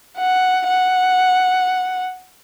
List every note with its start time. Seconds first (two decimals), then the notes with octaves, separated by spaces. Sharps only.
0.18 F#5
0.67 F#5